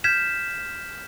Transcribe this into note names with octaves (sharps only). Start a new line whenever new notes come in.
F6 G6 G#6 B6 E7